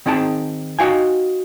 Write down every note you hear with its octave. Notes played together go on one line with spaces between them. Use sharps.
D#3 C4 D#4 G#4 G5 A5
D#4 F#4 F5 G5 G#5